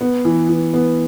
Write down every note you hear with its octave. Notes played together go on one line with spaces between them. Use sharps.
B3
E3
E3
B3